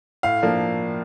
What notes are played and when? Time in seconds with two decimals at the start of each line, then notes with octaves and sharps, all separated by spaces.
0.23 A2 F5
0.42 F3 A#3 D4